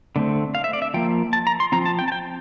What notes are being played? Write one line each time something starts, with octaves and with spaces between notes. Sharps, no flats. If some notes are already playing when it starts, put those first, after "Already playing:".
D3 A3 C4
F5
E5
D5
E5
F3 A#3 G5
A5
A#5
C6
F3 C4 A#5
A5
G5
A5
G5